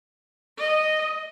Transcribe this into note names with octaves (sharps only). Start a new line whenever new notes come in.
D#5